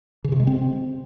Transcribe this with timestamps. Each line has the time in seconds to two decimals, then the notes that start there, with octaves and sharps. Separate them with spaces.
0.24 C#3
0.32 C3
0.40 G#3
0.47 C4